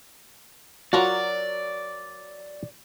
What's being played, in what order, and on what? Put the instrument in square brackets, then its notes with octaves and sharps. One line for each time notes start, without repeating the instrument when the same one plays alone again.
[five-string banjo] F#3 A#4 F#5 [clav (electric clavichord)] F4 F#4 [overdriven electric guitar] D5